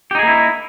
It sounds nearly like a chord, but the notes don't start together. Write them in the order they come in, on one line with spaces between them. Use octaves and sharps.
G4 D#4 G#4 A#3 E4